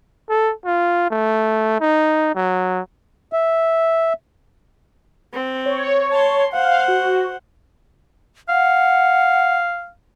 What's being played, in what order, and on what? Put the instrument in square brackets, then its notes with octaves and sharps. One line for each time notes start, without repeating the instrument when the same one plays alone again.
[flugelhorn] A4
F4
A3
D#4
F#3
[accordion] E5
[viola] C4
[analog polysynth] C#5
[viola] A5 C6
[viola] C5 F#5 [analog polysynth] F5
[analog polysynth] F#4
[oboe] F5 [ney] F#5